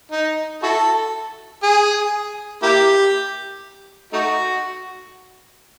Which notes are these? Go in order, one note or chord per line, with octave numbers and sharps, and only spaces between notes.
D#4
E4 F#4 A4
G#4
A#3 E4 G4
A3 D#4 F#4